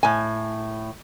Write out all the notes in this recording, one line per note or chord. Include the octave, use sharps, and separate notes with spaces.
A2 G#5